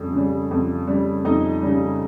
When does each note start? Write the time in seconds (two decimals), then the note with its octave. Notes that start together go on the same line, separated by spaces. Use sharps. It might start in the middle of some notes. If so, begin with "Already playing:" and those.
Already playing: F2 C#3 G3
0.14 C#3 G3
0.51 F2
0.87 C#3 G3
1.24 F2 D#4 D#5
1.62 C#3 G3